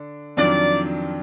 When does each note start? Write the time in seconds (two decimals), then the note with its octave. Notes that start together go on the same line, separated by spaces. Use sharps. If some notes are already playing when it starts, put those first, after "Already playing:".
Already playing: D3 D4
0.37 F2 D#3 F#3 D4 F4 D5